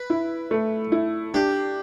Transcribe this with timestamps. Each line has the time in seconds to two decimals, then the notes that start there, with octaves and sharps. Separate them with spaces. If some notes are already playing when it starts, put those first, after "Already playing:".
Already playing: B4
0.10 E4
0.51 A3
0.92 E4
1.34 D4 G4